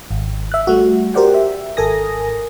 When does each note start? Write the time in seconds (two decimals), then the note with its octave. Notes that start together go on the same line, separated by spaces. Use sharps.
0.11 G#1
0.52 E5 F#6
0.67 G3 A3 F#4
1.14 G4 A#4 C5 D5 F#5 G5
1.34 E5
1.77 G#1 A4 A#4 G#5 D#6 A#6